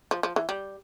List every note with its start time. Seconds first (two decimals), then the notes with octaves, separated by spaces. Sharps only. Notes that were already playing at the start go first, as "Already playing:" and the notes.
0.11 F3
0.23 F3
0.36 E3
0.49 G3